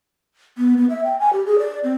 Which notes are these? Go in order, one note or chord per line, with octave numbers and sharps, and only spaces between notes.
B3
B3
E5
G5
G#5
G4
G#4
D5
C4